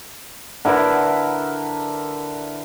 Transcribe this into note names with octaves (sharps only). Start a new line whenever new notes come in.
D3 E4 A#4 B4